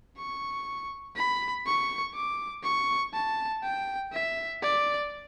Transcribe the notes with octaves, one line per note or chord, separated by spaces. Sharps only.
C#6
B5
C#6
D6
C#6
A5
G5
E5
D5